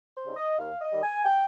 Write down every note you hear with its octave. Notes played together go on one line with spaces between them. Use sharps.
C5
C#3 G3 C4 D#4
D#5
D#2 F5
D#5
D#3 G3
G#5
G5